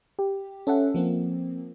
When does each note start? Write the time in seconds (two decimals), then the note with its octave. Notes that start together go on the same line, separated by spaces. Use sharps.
0.19 G4
0.67 C#4 A4 E5 F#5
0.94 F3 A#3 C4